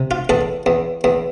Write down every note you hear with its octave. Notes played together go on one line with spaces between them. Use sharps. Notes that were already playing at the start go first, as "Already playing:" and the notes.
Already playing: C3
F4
E2 A4
E2
E2